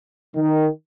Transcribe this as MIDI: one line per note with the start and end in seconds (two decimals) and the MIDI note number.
0.36 0.67 51